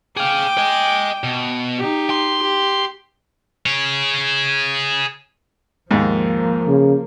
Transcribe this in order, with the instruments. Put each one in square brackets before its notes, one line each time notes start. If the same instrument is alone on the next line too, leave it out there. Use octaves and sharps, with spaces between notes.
[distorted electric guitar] G#4 F5 [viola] G5 D6
[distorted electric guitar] D#5 G#5
B2
[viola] D#4 G4
[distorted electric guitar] C6
[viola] G4
[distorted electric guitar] G#4 C#5
[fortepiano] D#2 G#2 [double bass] F3 A#3
[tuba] C#3